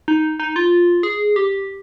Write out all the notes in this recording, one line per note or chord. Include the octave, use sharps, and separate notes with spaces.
D#4
D#4
F4
G#4
G4